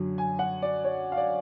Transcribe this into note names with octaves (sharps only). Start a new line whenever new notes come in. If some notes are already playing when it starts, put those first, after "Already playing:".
Already playing: F#2 D3 F#3
G#5
F#5
D5
C#5
F5
D5